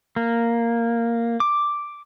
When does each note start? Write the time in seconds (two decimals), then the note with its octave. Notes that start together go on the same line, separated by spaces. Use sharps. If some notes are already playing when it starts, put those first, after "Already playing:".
0.16 A#3
1.40 D6